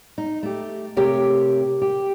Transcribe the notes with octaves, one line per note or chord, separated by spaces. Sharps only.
D#4
A3 G4
C3 A3 G4 A#4 C#5 G5
G4